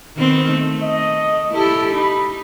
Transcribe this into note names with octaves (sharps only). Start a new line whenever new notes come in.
D#3 B3 C4
A3
D#5
E4 G4 A4
D#4 B5